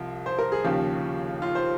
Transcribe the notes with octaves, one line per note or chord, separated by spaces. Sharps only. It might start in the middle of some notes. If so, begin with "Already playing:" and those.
Already playing: C2 F3
C5
A#4
G#4
D#2 C#3 F3 G4
F4
C5